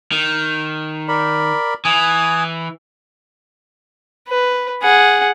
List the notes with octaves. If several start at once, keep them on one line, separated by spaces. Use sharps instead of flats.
D#3
A#4 D5 B5
E3 G#5 D#6
B4
G#4 F#5